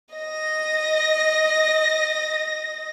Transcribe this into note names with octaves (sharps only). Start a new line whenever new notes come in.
D#5 A#6